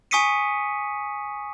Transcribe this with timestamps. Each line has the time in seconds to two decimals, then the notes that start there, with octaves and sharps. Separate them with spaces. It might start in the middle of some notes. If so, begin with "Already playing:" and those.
0.11 G#5 C#6 D#6 B6 C#7 D#7